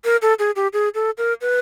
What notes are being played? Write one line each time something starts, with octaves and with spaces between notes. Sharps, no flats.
A#4
A4
G#4
G4
G#4
A4
A#4
B4